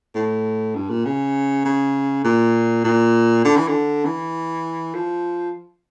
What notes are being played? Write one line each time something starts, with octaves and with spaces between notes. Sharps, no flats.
A2
G2
A#2
C#3
C#3
A#2
A#2
D3
E3
D3
E3
F3